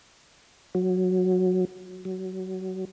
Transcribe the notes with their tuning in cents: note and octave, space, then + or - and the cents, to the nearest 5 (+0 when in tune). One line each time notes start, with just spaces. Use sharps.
F#3 -10
F#3 +20